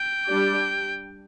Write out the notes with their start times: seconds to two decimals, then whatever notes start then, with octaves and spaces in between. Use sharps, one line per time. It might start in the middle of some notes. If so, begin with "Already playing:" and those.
Already playing: G5
0.28 G3 D4 G4 D5